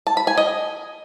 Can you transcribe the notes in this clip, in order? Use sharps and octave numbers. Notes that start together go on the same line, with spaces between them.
A5
B5
G#5
D#5